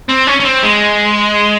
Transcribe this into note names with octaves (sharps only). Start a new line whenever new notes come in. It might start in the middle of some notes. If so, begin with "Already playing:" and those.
C4
C#4
C#4
C4
G#3